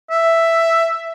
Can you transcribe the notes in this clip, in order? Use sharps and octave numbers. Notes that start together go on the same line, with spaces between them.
E5